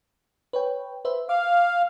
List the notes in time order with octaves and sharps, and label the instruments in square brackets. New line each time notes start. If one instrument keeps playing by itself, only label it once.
[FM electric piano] B4 C#5 G5
B4 C5 E5
[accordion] F5 [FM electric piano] D6